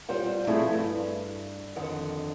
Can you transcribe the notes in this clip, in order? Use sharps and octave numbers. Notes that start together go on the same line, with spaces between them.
G3 F4 C5 F#5
F3 A3 C4 E4 G#4
G2
F2 D3 D#3 F#5